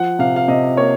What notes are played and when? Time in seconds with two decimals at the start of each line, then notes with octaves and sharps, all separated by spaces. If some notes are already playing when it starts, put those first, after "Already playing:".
Already playing: F3 F#5
0.19 C3 F5
0.36 F5
0.48 C3 D#5
0.77 A#3 C#5